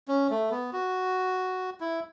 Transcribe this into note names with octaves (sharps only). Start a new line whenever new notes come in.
C#4
A3
B3
F#4
E4